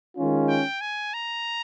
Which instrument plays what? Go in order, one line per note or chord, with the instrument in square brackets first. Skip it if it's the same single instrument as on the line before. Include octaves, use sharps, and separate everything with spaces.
[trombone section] D#3 G#3 C#4 F4
[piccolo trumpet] G5
G#5
A#5